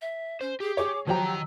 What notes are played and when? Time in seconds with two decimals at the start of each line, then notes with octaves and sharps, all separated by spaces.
0.01 E5
0.41 C#4 C5
0.60 G4 G#4
0.77 G#4 C#5 D6
1.07 D#3 F3 F#3 G4 C5 A#5
1.24 E6